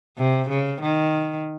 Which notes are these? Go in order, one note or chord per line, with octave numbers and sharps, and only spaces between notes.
C3
C#3
D#3